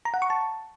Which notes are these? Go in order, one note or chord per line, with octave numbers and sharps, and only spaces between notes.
A#5
F#5
C#6
A5